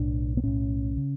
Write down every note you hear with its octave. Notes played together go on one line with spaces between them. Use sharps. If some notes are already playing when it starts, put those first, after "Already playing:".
Already playing: B1 A2 D4
B3
B1 A2 C#4
C#3